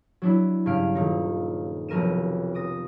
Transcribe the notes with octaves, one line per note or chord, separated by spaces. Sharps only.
F#3 D4 E4
G2 C#3 C#4 F5 D7
D#1 D#4
F1 B1 A#4 D#7 E7
D6 D#6 A#6